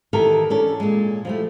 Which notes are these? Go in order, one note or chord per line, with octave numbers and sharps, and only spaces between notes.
D#3 E3 G4 A4 A#4
C#4 D4 A4
A#2 G#3
F3 G3 A3